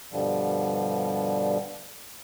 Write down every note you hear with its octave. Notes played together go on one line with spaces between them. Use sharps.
G2 B2 D3 F3 G3